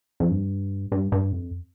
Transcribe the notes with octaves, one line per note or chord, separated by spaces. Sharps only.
F2
G2
G2
G2
F2